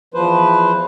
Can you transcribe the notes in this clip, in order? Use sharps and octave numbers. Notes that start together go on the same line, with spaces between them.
E2 F3 B4 C5